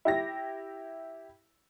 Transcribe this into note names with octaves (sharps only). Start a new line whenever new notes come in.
E4 G4 A#6